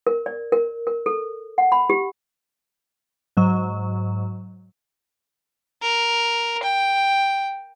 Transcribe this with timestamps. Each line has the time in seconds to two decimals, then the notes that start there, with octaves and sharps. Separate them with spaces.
0.07 A#4
0.26 D5
0.52 A#4
0.87 A#4
1.06 A4
1.58 F#5
1.72 B5
1.90 G4
3.37 G#2 F#3
5.82 A#4
6.63 G5